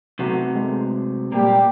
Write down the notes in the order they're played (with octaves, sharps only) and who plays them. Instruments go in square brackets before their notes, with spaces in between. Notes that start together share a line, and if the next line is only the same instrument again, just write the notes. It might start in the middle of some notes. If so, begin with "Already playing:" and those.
[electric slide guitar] C3 F#3 [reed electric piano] A3 B3 F#4
[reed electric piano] G#3 A3 B3
[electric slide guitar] A#2 A#3 [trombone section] G3 G4